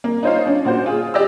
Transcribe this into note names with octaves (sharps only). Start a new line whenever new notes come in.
A#3
D#4 F4 C5 C#5 F5
C#4 D4
A#2 F#4 C5
F4 G#4
G4 D5 D#5 E6